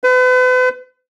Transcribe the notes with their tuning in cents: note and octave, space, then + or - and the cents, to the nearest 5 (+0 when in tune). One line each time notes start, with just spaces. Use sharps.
B4 +40